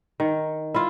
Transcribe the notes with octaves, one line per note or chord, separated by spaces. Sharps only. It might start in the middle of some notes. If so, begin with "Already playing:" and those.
D#3
E4 F4